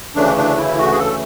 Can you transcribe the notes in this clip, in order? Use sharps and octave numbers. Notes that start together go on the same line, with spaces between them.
D2 C#3 E3 A3 D4
D4
E4
F#4
G#4
A4